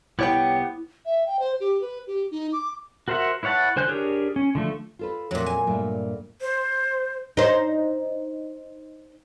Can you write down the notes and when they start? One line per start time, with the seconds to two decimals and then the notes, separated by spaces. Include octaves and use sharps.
0.19 C2 B3 E4 G4 C#5 G5
1.06 E5
1.27 G5
1.39 C5
1.60 G4
1.81 B4
2.07 G4
2.31 D#4
2.53 D6
3.08 F#4 A#4 C5 E5 F#5
3.43 E4 B4 C#5 F#5 A5
3.76 D3 C5 G#5 F#6 G6
3.88 D4 G4 G#4 A#4 C#5
4.36 C#4
4.55 D3 F3 A3
4.99 F4 A4 B4
5.31 F2 A#2 F#3 A3
5.46 G#5
5.67 G2 A#2 A3
6.41 C5
7.37 D#4 C5